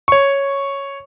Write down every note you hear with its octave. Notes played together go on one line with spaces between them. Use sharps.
C#5 C#6